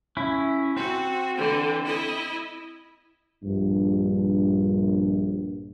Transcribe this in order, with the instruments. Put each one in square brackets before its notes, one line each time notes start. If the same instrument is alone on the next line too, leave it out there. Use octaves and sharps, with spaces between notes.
[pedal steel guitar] C#4 E4
[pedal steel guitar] C4 [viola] F#4
[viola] D3 E3
E4 D#5
[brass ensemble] A#1 G2